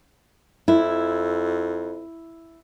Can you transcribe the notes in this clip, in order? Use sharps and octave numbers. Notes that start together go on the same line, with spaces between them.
F2 E4